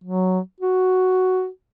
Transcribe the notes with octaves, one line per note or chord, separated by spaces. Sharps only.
F#3
F#4